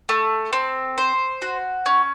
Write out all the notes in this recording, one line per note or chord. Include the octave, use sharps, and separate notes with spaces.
A3
C4
C5
F#4
C#4